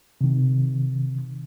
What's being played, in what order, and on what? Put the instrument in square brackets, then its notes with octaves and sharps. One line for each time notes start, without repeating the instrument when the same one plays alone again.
[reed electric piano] C3 D#3